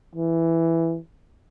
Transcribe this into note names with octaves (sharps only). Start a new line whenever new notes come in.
E3